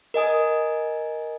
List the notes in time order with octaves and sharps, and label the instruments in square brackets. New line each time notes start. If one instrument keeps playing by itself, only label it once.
[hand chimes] A#4 D#5 G#5 D#6